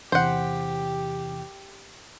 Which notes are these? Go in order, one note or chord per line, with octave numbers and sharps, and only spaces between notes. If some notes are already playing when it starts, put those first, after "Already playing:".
E2 C3 E3 G4 C5 F#5